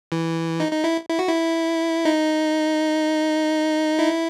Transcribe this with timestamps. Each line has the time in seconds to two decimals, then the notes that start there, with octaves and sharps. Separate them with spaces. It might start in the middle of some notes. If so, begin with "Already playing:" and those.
0.12 E3
0.60 D#4
0.72 D#4
0.84 E4
1.09 E4
1.19 F#4
1.29 E4
2.05 D#4
3.99 E4